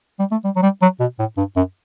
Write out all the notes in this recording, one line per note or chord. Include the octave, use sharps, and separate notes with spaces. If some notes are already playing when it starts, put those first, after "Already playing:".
G3
A3
G3
F#3
G3
F#3
B2
A2
G2
F#2